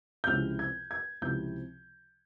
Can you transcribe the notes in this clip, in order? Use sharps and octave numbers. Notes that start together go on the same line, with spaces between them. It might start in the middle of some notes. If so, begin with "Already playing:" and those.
G6
C#2 C3 F3 C4 E4 F6
G#6
G#6
C#2 C3 F3 C4 E4 G6